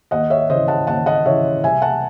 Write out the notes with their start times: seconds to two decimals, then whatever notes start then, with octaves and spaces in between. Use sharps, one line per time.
0.11 D#2 D#5 F#5
0.30 C#5 E5
0.49 C#3 E3 C5 D#5
0.68 F#5 A5
0.87 D#2 F#5 A5
1.06 D#5 F#5
1.25 C#3 E3 C#5 E5
1.63 C2 E5 G#5
1.82 F#5 A5